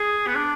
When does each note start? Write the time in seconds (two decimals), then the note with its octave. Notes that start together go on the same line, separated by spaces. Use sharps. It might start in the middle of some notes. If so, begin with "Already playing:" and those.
Already playing: G#4
0.27 B3
0.35 D4